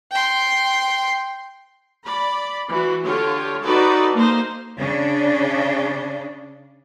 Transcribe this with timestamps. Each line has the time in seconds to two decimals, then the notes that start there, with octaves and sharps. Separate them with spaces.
0.12 G5 C6
2.03 D5 B5
2.68 E3 F#4
3.04 D3 F4 G4 C#5
3.63 D#4 F#4 A4 B4 D5
4.13 A#3 D#4 C5
4.79 C#3 D4